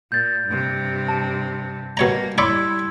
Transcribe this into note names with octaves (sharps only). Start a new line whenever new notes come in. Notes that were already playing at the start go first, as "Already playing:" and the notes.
A#2 G6 A6
G2 C3
A5
B2 G3 A#3 C#5 A#5
G3 E4 C#5 D5 B5 C6 E6 G#6